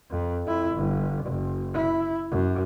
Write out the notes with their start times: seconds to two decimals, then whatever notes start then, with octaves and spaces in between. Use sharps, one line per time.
0.10 F2
0.45 F2 E4
0.75 G1
1.26 F#1
1.74 E4
2.30 F#2